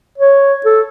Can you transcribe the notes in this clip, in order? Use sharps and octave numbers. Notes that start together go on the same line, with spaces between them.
C#5
A4